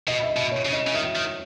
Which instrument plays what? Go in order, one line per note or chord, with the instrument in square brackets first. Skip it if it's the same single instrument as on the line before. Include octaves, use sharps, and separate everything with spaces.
[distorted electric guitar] B2 [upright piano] D#5
[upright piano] E5
D#5
[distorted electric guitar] B2
[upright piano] C#5
[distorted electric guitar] C#3
[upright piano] D#5
[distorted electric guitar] C#3
[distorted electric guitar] D#3 [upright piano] E5
[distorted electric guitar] D#3